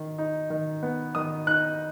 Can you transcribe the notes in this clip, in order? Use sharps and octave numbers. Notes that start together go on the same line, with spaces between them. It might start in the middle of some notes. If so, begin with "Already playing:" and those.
Already playing: D#3
D#4
D#3
B3
D#3 D#6
D#4 F#6